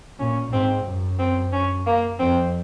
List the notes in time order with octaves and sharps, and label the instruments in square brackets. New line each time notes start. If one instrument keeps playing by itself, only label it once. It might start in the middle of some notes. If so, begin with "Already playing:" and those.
[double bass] A#2 [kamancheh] C#4
[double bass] G#2 [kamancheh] C4
[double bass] F#2
[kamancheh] C4
C#4
A#3
[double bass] F2 [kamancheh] C4